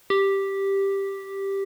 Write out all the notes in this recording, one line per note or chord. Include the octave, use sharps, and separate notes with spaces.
G4